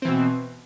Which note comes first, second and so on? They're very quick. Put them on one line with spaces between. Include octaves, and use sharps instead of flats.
C4 E3 B2